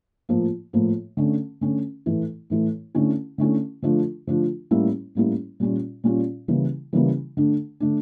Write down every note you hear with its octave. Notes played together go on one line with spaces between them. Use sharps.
A2 F3 A#3
A2 F3 A#3
D3 A3 C#4
D3 A3 C#4
A2 E3 A3 E4
A2 E3 A3 E4
D3 A3 C#4 E4
D3 A3 C#4 E4
D3 F3 A3 D4 F4
D3 F3 A3 D4 F4
A2 G3 A#3 C#4 E4
A2 G3 A#3 C#4 E4
A#2 G3 C#4 F4
A#2 G3 C#4 F4
C#3 E3 G3 A#3 E4
C#3 E3 G3 A#3 E4
D3 A3 D4
D3 A3 D4